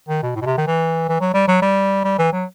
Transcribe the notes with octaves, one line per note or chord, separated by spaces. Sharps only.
D#3
B2
A2
B2
C3
D#3
E3
E3
F#3
G3
F#3
G3
G3
E3
F#3